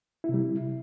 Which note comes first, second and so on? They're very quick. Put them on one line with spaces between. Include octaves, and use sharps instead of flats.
E4 C3 G3